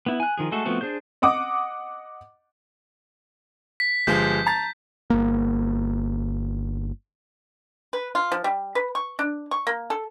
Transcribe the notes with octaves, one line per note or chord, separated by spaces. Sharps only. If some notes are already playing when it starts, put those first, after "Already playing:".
B3 E4
G#5 F#6
D#3 F3 G#4
G#3 A3 F#4 A4
F3 A3 B3 C4 F#4
D4 G#4 C5 G6
D#5 F#5 D6 D#6
B6
G1 F3 G#3 G6
A5 A#5 A6
G1 A#3
B4
F4
F3
G3
B4
C#6
D4
C#6
A#3
A4